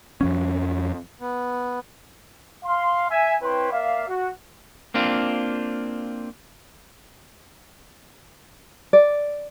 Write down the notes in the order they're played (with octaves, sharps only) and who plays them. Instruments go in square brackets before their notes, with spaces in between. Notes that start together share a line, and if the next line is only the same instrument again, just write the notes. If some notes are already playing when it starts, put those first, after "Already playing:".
[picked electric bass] F2 F3 C#4
[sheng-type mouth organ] B3
[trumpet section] F5 C6
E5 G#5
C4 E4 B4 C#5 G5 C6
A#3 D5 E5 F5
F#4
[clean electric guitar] A#3 C4 D4 F4
[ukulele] D5